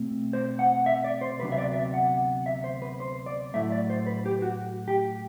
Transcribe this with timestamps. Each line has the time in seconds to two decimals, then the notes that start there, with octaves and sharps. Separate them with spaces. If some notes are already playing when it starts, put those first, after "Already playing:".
Already playing: B2 A3 C4
0.33 C5
0.59 F#5
0.86 E5
1.04 D5
1.21 C5
1.40 D2 C3 F#3 B3 D4 B4
1.52 E5
1.58 D5
1.76 E5
1.94 F#5
2.46 E5
2.64 C5
2.82 B4
3.00 C5
3.26 D5
3.54 A2 F#3 A3 E4 E5
3.72 D5
3.90 C5
4.07 B4
4.26 G4
4.42 F#4
4.88 G4